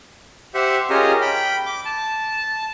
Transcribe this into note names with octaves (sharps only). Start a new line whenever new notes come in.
G4 C5 E5 F#5
C#4 F4 G4 G#4 A#4 D#5
G5 B5
D6
A5